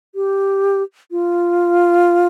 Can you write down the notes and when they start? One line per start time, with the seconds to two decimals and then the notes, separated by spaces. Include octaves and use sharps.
0.15 G4
1.11 F4